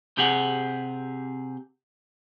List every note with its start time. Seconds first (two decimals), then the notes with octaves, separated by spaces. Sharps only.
0.17 C3 C4 G4 G#4 F#5